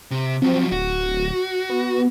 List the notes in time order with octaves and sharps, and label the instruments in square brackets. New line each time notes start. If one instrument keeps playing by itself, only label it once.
[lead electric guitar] C3
[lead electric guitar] F3 F#3 [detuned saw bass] C4
[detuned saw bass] D1 [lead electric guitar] F#4
[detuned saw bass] B3